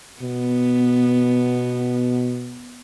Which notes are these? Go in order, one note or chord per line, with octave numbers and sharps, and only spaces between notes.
B2 B3